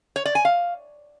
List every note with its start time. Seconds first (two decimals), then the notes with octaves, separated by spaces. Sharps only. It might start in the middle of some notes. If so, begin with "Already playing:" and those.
0.16 C#5
0.25 D5
0.35 G#5
0.45 F5